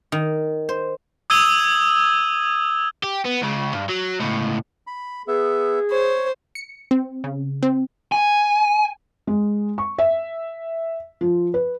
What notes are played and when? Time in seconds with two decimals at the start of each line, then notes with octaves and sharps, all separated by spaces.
0.12 D#3
0.69 C5
1.30 D#6 E6 G#6 D#7 G7
3.03 G4
3.25 B3
3.42 C#2 C#3
3.73 G2
3.89 F#3
4.20 C#2 A2
4.87 B5
5.28 B3 G#4 E5
5.91 C5 C#5
6.55 C#7
6.91 C4
7.24 C#3
7.63 C4
8.12 G#5
9.27 G#3
9.78 C#6
9.98 E5
11.21 F3
11.54 B4